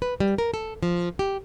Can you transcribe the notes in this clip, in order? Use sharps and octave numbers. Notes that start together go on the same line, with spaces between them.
B4
G3
A#4
A4
F3
G4